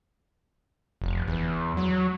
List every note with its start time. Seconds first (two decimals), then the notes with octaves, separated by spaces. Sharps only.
1.02 F1
1.28 E2
1.77 F#3